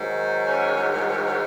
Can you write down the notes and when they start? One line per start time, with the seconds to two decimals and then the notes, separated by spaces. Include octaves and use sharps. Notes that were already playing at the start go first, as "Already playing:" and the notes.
Already playing: G#2 D#3 F#3
0.46 C#4